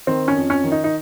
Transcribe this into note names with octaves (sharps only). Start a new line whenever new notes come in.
D#3 C4
C#4
F2
C#4
D#3
D#4
D#4